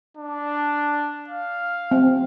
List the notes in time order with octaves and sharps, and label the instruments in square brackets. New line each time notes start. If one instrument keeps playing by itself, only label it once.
[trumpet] D4
F5
[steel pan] C4